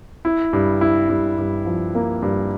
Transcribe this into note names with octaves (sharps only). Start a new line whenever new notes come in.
E4
G2
E4
G2
G2
F3
A#3
G2